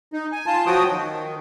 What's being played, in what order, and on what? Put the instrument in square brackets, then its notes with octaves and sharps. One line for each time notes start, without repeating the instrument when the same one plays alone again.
[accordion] D#4
G#5
F4 A5
F3 F#3 F#4 G5 D#6
D#3